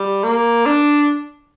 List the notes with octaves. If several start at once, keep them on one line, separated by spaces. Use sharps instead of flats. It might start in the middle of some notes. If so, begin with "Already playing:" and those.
Already playing: G3
A#3
D4